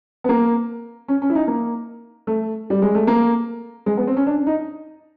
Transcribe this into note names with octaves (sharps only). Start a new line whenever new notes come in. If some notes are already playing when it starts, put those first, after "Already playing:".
B3
A#3
C#4
C#4
E4
D#4
A#3
A3
G3
G#3
A3
A#3
G#3
B3
C4
C#4
D4
D#4